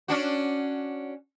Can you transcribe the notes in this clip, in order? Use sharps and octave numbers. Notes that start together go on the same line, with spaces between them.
C#4 D4 F#4